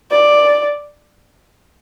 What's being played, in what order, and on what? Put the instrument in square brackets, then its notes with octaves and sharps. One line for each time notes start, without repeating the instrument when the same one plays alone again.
[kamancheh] D5